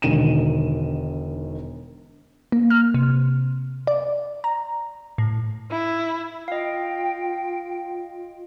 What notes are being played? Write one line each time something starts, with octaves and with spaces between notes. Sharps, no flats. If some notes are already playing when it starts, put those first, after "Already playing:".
E1 D3 D#3 D#7 E7
A#3
F6
C3
D5
A#5
A2
E4
F4 D#5 F5 G5